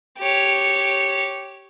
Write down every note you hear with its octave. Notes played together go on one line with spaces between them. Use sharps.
G4 C#5